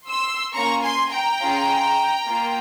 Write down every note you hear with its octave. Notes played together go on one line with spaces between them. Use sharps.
C6 E6
A#3 C#4 F4 A#5 C#6
G#5 C6
G5 A#5
C#4 F4 G#4
A#3 F4